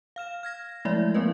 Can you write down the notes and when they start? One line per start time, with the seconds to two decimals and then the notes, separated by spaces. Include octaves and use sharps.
0.16 F5 F6 E7
0.43 F6 G#6 A#6
0.85 F3 G#3 A3 E4 D5 E5
1.15 F3 A#3 C4 E4 B4 D#5